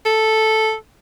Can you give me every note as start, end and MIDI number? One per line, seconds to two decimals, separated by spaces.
0.06 0.74 69